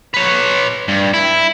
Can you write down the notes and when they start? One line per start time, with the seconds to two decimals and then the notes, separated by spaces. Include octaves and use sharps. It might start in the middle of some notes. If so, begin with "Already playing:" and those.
0.14 B4 C#5
0.88 G2
1.13 E4